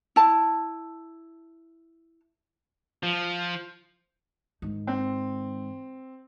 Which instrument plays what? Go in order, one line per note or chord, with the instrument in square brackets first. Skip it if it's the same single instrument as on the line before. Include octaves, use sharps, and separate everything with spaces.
[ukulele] E4 A5
[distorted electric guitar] F3
[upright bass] G#2 D#3
[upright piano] C4